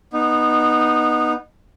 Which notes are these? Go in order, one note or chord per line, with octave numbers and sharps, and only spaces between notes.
B3 D#4